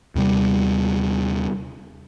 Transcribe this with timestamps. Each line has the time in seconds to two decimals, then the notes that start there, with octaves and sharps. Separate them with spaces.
0.15 D#2 C3 G3